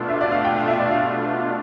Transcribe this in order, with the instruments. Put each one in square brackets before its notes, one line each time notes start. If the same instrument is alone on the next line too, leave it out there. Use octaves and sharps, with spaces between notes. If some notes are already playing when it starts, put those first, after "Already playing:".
Already playing: [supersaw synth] B2 A3 D4 F4
[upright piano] E5
D5
F5
G5
F5
E5
D5
F5